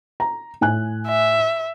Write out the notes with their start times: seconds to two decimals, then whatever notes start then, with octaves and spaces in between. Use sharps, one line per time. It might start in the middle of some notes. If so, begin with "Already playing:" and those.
0.20 A#5
0.61 A2 G#5 F#6
1.08 E5